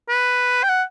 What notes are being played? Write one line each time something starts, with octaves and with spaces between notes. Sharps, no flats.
B4
G5
F#5